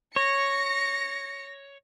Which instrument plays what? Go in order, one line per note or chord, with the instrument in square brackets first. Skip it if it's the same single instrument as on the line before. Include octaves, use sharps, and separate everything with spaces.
[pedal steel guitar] C#5 [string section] A#6 C#7